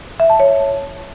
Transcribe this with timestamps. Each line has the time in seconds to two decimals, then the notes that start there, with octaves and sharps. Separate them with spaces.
0.20 E5
0.30 A5
0.40 C#5